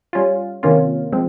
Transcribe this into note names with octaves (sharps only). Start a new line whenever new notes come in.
G3 C#4 F4
C3 D#3 A#3 C#4 F4
F3 G#3 C4